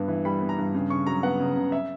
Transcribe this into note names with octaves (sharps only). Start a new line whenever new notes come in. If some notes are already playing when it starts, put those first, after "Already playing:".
Already playing: G2 B3
E3
G3 B5
B3
A#5
G2
C#3
C#3 C#6
F#3 A#5
B3 F#5
C#3
C#3
E5